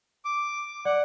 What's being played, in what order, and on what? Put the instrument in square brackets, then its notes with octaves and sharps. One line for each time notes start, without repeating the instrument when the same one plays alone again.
[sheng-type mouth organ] D6
[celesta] D5 [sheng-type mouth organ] F#5